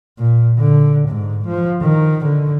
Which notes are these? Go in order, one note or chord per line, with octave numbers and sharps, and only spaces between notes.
A#2
D3
G#2
F3
D#3
D3